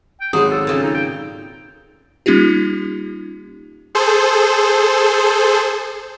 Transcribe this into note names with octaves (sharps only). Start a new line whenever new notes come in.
G5
G#1 F#3 G#3 G#4
A4
A#2 C#3
D#4
G5
G3 A#3 C#4 D#4 F4 G4
G#4 A4 C5